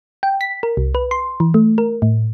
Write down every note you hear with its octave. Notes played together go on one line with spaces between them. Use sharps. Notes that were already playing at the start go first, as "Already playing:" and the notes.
G5
B6
A#4
C2
B4
C6
E3
A3
A#4
A2